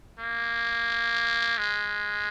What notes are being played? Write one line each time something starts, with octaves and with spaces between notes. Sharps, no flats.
A#3
G#3